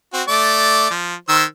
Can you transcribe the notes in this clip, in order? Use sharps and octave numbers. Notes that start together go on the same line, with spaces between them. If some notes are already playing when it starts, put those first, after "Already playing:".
C4 F#4
A3 D5 D6
F3
D#3 C5 E6